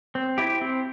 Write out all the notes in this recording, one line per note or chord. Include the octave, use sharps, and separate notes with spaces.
C4
E4 G4
C4